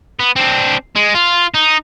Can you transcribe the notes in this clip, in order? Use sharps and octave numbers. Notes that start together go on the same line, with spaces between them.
B3
C4 D4
G#3
F4
D#4